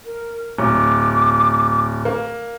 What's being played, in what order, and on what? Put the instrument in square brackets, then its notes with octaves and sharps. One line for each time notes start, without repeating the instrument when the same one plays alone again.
[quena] A#4
[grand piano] D1 [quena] D6
[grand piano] A#3